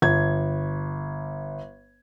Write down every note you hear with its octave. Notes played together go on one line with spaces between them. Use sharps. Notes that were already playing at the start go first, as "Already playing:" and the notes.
G1 G#6